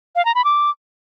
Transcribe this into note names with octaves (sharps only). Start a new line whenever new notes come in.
F5
A#5
B5
D6